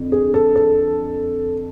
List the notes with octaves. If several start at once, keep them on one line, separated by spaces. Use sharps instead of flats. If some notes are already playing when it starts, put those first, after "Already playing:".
Already playing: F2 D3
G#4
A4
A4